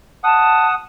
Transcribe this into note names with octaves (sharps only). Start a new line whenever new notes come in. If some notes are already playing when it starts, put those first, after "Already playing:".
F#5 A5 D#6